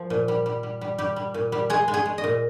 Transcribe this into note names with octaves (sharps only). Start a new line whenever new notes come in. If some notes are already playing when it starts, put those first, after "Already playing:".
Already playing: F3
A#2
G3
G3
G3
G3
G3 G4
G3
A#2
G3
G#3 G#4
G#3
G#4
G#3
D#5
A#2